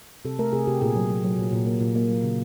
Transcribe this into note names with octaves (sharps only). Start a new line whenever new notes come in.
C3 A4
A3 A#4
C3 G#4
C3 G4
A#2 G#4
F#3
F#3
F#3
A#2
A#2
A#3
A#2
A#3
F#3
C#3